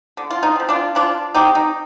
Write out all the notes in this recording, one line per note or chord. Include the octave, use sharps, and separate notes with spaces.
D3
F4
D#4
F3 C4
D4 F4
F3 D4 F4
C4 D#4 G4
D#4